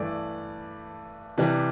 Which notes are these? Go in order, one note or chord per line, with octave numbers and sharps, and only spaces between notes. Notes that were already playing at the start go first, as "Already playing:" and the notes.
Already playing: G2 E3 A3 D5
C3 E3 G3 D4